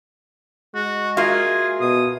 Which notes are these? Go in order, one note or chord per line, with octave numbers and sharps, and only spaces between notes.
G#3 F#4
A#3 F4 F#4 G#4 E5
B2 D#6